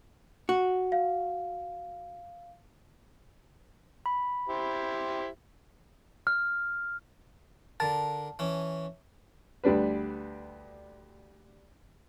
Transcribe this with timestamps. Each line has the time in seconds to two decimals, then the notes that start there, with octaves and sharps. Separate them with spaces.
0.49 F#4
0.92 F5
4.06 B5
4.49 E4 G4 C5
6.27 F6
7.80 D3 A#4 A5
8.39 E3 C#4
9.64 D2 G3 D4 B4